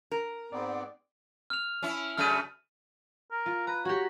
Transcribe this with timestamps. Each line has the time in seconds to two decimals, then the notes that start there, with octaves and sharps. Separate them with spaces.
0.11 A#4
0.52 G#2 B3 C4 D5
1.50 F6 F7
1.83 C#4 E4
2.17 F#2 C#3 A3 F6 D#7
3.31 A#4
3.46 F4
3.67 B4 A#5
3.85 F#4 G4 C#5